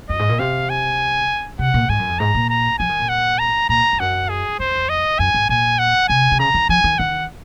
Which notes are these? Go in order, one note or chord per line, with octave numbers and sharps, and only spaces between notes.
F#2 D#5
G#2
A#2
C3 F5
G#5
C3 F#5
A#2
G#2 G#5
F#2
F2
G#2 A#5
A#2
A#5
F3 G#5
D#3
A#2
F#5
A#5
A#2 A#5
F2
F#2 F#5
G#4
F2 C5
D#5
F#2 G#5
G#2
A#2 G#5
F#5
C3 G#5
C3
C#3 A#5
D#3
F3 G#5
D#3
D#3 F#5